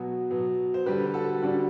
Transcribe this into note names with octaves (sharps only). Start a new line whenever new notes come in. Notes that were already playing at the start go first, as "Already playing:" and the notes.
Already playing: B2 F#3 B3 F#4
B2 F#3 B3
C5
D3 G3 D4 G4 B4
F#4 A4
D3 G3 D4 F#4